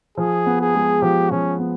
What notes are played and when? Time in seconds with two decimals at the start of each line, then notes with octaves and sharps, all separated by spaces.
0.17 F3 G#4
0.46 B3
0.61 G#4
0.75 G#3
1.02 F3 G4
1.31 F3 C#4
1.59 B3